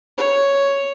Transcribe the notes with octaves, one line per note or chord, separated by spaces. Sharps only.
C#5